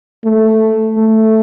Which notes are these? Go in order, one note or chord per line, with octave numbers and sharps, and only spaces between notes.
A3
A3